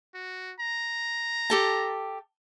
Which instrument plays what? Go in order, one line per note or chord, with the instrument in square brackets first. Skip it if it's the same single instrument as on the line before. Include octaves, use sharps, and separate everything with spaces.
[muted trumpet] F#4
A#5
[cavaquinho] G4 A4 A5